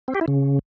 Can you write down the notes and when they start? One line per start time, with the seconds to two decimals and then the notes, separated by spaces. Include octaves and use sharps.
0.08 C4
0.15 G4
0.21 E4
0.28 C#3